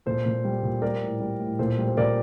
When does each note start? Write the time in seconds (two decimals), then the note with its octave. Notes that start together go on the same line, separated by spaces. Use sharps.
0.06 A#2 A4 C5
0.26 A#2
0.45 G3
0.63 A#2
0.82 G3 A#4 D5
1.02 A2
1.20 G3
1.40 A2
1.59 A#2 A4 C5
1.78 G3
1.88 C5
1.97 A#2 A#4 D5